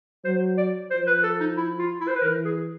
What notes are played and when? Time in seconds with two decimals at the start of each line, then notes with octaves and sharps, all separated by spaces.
0.25 F#3 C5
0.58 D5
0.90 F3 C5
1.07 B4
1.23 A4
1.40 D#4
1.57 E4
1.79 F4
2.01 E4
2.08 C5
2.16 B4
2.22 E3 A#4
2.45 G#4